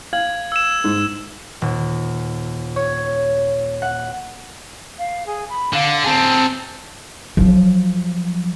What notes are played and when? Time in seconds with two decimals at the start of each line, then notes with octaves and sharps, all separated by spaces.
0.13 F5 G#6 F#7
0.52 E6 E7
0.84 G#2
1.62 D#1
2.76 C#5
3.82 F#5
4.98 F5
5.26 G#4
5.49 B5
5.73 D3 F5
6.04 C4 G#4 A5
7.37 F3 F#3